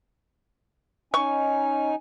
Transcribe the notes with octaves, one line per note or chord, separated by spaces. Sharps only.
C#4 D#4 G#5 C#6